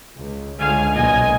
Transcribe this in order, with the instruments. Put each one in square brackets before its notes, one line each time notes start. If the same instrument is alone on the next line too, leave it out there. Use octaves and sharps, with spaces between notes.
[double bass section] C#2
[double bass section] C#2 D3 G#3 [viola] F5 G#5
[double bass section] B1 A#2 [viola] D#5 G#5